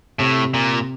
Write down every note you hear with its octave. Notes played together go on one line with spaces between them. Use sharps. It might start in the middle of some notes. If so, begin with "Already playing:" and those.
A2 C3
A#2